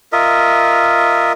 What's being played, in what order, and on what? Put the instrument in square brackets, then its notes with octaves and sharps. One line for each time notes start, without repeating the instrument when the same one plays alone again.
[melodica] F4 A#4 D#5 E5